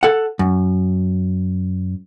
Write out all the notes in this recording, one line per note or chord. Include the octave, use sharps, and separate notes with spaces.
A4 F#5
F#2